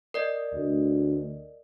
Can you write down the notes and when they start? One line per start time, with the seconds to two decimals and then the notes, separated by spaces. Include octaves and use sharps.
0.14 A#4 D5 D#5
0.54 D2